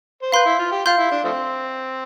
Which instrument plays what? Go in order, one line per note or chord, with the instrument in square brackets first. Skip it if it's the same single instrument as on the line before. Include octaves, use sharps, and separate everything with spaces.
[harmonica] C5
[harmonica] B4 [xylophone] F5 C6 G6
[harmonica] E4
F4
G4
[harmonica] F4 [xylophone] F5 C6 G6
[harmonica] E4
D4
F3 A3 C4